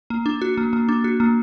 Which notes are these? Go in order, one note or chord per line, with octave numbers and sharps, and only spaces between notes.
A#3
D4
F#4
A#3
A#3
D4
F#4
A#3